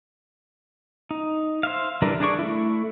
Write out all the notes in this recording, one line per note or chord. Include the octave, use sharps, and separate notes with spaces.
D#4
C5 E5 F5
D3 E3 G3 D4 A#4
D4 G#4 D5 C#6
A3 E4